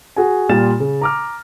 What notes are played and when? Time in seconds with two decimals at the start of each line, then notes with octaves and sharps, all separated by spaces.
0.16 F#4 G#4 G#5
0.49 A#2 G3 F4 G4 A6 E7
0.80 C#3
1.01 A#5 D6 F6